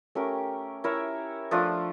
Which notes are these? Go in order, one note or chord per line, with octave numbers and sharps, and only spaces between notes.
A3 C#4 G4 A#4
E4 A#4 C#5 E5
F3 A3 D4 F4